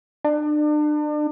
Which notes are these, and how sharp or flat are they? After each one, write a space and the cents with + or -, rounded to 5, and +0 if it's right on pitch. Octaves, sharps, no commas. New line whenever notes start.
D4 +35